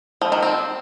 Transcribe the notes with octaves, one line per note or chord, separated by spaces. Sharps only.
F3
D#3
C4